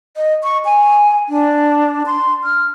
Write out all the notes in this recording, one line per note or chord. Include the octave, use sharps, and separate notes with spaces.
D#5
C#6
G#5
D4
C6
F6